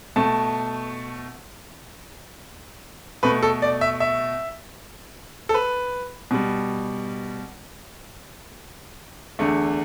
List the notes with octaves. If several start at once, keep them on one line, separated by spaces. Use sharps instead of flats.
B2 A3 A5
B2 A3 B4
A4
D5
E5
E5
A4
B4
B2 G3
E2 D3 A3